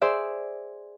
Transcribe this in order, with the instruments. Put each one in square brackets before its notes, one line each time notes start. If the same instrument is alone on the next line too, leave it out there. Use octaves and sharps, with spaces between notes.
[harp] G#4 C5 D5 E5